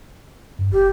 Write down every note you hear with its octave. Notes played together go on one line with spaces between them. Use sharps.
G2
F#1 G4